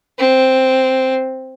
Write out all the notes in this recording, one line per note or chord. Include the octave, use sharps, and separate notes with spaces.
C4